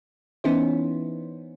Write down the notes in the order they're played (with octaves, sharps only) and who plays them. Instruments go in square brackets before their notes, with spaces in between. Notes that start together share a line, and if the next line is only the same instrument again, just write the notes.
[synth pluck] E3 B3 C#4 D#4 E4 C5